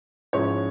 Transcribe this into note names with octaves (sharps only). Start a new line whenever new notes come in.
G#2 F3 G#3 C#4 E4 C#5